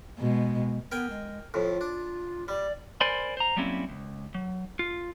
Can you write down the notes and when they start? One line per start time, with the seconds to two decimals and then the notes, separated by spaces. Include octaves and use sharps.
0.19 B2 G#3
0.92 B3 A#4 G5 G#5
1.10 G#3
1.54 F2 A2 F4
1.81 D4
2.48 G3 D5
3.01 A#4 C5 D5 G#5 B5 C6
3.37 C5 A#5
3.56 F#3 G3 A#3 C4 C#4 E4
3.89 C#2
4.35 F#3
4.79 F4